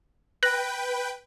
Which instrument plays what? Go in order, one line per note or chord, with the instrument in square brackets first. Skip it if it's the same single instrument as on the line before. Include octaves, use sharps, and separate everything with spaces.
[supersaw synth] B4 G5 [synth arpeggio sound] F#6 A#6